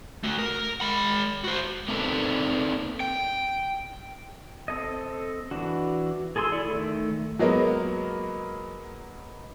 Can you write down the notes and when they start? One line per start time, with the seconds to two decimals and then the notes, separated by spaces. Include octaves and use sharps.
0.23 A3 F#4
0.39 A#4
0.81 G#3 B5
1.44 F#4 C5
1.88 A#3 C4 D4 D#4 A4 B4
3.00 G5
4.68 C4 A4 D#5
5.51 E3 D4 F#4
6.36 G#4 A4 G#5 C6 E6
6.52 E4 A4 D5
6.65 D#3 A3
7.39 F#3 G#3 A#3 B3 A#4